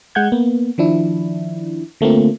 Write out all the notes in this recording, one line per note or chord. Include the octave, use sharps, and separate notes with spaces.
G#3 F#5 G6 G#6
A#3 B3
D#3 F3 D4 E4
D3 A3 A#3 C4 F4